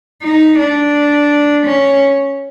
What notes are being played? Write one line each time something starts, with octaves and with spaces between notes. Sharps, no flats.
D#4
D4
C#4